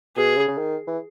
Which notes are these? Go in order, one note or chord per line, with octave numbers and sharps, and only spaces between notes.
B2 G#4
C#3
C#3
D#3
E3